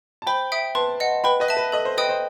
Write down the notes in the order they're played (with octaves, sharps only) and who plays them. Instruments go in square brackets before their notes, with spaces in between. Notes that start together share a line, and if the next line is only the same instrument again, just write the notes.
[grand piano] A5
[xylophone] C5 [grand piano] G5 B5
[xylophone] E5 G5 D#6
[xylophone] B4 [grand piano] A5 C6
[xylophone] D#5 F#5
[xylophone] B4 [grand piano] G5 B5
[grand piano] B4 D#5
[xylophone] E5 A5
[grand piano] B4
[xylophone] A4 [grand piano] D#5
[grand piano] C5
[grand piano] B4 [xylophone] D#5 G5 D#6
[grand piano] C5